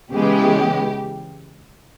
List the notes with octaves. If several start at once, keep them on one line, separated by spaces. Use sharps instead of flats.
C#3 E3 G#3 B3 G4